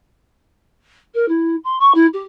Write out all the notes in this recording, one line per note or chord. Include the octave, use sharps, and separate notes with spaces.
A#4
E4
C6
C#6
E4
G4